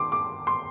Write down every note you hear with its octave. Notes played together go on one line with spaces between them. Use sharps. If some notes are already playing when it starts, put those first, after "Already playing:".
Already playing: D#3 C6 D6
D6
C6